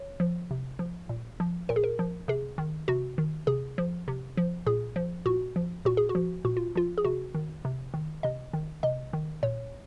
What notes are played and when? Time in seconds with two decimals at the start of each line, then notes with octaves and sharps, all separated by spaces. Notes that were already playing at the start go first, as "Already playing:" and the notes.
Already playing: C#5
0.20 F3
0.51 C3
0.79 F3
1.09 A#2
1.40 F3
1.69 A#2 A#4
1.76 G#4
1.84 A#4
1.99 F3
2.28 C3 G#4
2.58 D#3
2.88 C3 F#4
3.18 D#3
3.47 C3 G#4
3.78 F3
4.08 C3
4.37 F3
4.66 A#2 G#4
4.96 F3
5.26 A#2 F#4
5.56 F3
5.85 A#2 F#4
5.97 G#4
6.09 F#4
6.15 F3
6.45 A#2 F#4
6.57 F4
6.75 F3 F4
6.98 G#4
7.04 C3 F#4
7.34 D#3
7.65 C3
7.94 D#3
8.23 C3 D#5
8.53 D#3
8.83 C3 D#5
9.13 D#3
9.43 A#2 C#5